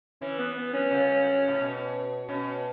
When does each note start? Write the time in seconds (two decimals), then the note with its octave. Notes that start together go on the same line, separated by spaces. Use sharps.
0.22 E3 C#4
0.39 B3
0.57 B3
0.73 C#4
0.91 C#3
1.48 A2
1.60 B2
2.29 B2 C#4